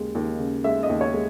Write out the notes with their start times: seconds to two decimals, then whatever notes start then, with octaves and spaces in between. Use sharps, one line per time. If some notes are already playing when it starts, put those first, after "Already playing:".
Already playing: D#2 C#3 G#3
0.15 D#2
0.39 C#3
0.64 G#3 E5
0.83 D#5
0.89 D#2
1.01 C#5
1.14 G#3